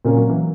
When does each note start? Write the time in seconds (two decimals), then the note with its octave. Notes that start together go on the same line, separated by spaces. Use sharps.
0.05 A#2 A#3 C#4
0.17 F#3
0.30 E3